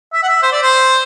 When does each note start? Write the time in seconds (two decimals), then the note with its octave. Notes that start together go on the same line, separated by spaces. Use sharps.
0.13 E5
0.23 F#5
0.28 E5
0.42 C5
0.52 D5
0.62 C5